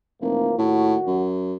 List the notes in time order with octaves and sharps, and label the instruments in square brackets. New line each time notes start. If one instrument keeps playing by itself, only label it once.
[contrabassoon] F1 [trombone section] E3 F3 A#3
[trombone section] D#2 F#4 [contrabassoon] A2
[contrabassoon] F#2